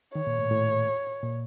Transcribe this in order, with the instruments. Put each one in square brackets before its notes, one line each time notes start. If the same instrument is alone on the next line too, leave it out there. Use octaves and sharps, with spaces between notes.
[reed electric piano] D#3 [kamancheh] C#5
[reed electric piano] A#2
A2
A2
A#2